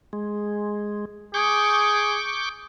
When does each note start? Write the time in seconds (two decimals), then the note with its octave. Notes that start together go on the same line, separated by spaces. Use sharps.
0.13 G#3
1.34 G#4 C#6 D6 G6